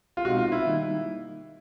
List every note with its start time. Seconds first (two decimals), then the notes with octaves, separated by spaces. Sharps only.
0.17 F4
0.25 B2 G#3 C4 D#4 F#4
0.38 F4
0.52 E4
0.66 D#3 G3 A#3 D#4